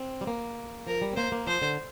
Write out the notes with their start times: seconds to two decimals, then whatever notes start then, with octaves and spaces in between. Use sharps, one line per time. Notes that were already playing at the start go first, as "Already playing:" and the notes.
Already playing: C4
0.21 G3
0.27 A#3
0.87 F3 A#4
1.02 G3
1.13 C4
1.16 A#3 C5
1.32 A#3
1.47 F3 C5
1.62 D3